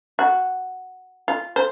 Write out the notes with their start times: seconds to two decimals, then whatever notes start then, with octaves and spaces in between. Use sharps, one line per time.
0.19 F#4
1.28 F4
1.56 C5